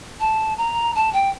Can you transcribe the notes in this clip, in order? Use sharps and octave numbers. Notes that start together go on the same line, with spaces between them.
A5
A#5
A5
G5